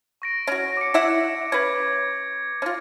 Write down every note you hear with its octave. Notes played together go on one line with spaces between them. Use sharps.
C#6 A#6 D7
C#4 F#4
D6 C#7
E4 E5 F#5
C#4 B4 G#6
C#4 F4